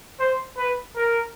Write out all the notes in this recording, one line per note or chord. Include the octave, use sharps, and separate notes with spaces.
C5
B4
A#4